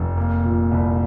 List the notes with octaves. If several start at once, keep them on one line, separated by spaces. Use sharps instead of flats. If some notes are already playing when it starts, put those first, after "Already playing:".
Already playing: F1
A#3
A#2
C2